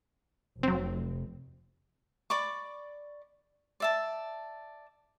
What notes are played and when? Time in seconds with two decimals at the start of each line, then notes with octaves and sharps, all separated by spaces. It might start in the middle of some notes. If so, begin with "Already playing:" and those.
0.63 F1 F#3 C4
2.30 D5 B5 C#6 D6
3.80 D5 E5 A5